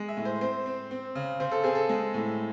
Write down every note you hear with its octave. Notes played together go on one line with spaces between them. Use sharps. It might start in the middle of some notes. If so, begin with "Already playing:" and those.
Already playing: G#3
E5
A2
C5
C4 C5
C4
C4
C#3
C#3 C5
A4
C4 G#4
A4
G#3
A2